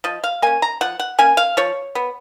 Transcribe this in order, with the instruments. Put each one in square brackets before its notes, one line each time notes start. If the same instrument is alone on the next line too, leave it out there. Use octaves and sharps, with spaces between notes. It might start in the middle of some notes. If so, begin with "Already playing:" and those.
[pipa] F3 D#5
F5
A#3 C#4 G#5
A#5
F3 F#5
F#5
A#3 C#4 G#5
F5
F3 C#5
B3